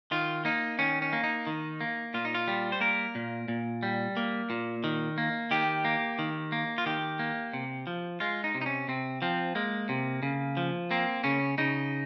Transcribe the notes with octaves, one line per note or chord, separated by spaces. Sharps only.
D#3 F4
A#3 D#4
D#3 C#4
C#4
A#3
D#4
D#3
A#3
A#2 F4
D#4
F4
G3
C5
A#3 A#4
A#2
A#2
G3
A#3
A#2
D#3
A#3
D#3 G4
A#3
D#3
A#3
F4
D#3 G4
A#3
C3
F3
G#3 F4
D#4
C3
D#4
C#4
C3 C4
F3 C4
G#3 A#3
C3
C#3
F3
A#3 C4
C#3 C#4
C#3 D#4